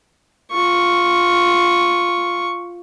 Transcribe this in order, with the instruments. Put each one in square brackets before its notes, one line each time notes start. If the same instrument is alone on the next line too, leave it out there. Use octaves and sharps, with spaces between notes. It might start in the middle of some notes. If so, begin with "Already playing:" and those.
[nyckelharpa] F4 C#6